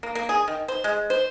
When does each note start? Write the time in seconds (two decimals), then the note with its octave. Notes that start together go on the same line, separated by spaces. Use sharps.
0.03 A#3
0.15 A#3
0.29 G#4
0.48 D#3
0.68 C5
0.84 G#3
1.10 C5